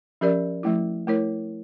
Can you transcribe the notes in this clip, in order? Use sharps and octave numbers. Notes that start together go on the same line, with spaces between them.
F3 C#4 G4 A#4 D5
F3 A3 E4
A3 E4 A#4 C#5